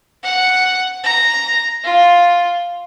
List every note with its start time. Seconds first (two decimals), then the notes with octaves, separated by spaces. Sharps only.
0.23 F#5
1.04 A#5
1.84 F4